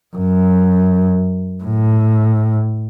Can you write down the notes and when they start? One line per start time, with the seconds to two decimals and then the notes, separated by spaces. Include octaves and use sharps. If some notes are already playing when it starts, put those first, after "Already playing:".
0.16 F#2
1.64 A2